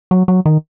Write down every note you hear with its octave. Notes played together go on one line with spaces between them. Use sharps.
F#3
F#3
D#3